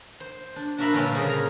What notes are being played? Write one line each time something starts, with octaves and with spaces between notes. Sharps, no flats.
C5
D4
D4 F#4 A#4 E5 F5 B5
G2 A#2 D3 A#3 C#4 F4
C#3 G#4 C5
A#5